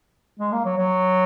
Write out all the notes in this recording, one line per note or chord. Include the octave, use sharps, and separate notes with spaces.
G#3
A#3
F#3
F#3